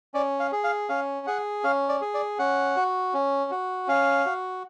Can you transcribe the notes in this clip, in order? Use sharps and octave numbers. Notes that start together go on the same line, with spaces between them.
C#4 D5
F5
G#4
F5
C#4 F5
G#4 F#5
C#4 F5
D5
G#4
D5
C#4 F#5
F#4
C#4
F#4
C#4 F5
F#4